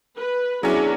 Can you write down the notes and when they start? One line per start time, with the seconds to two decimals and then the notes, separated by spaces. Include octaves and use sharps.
0.18 B4
0.63 F#3 B3 C#4 D4 E4 G#4